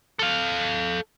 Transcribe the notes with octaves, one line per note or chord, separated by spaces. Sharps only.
A4 F5